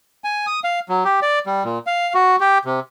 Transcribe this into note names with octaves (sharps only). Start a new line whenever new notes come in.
G#5
D#6
F5
F#3
G4
D5
G3
A#2
F5
F#4
G4
C3